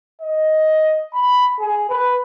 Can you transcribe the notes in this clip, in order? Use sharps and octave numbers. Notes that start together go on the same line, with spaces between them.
D#5
B5
G#4
B4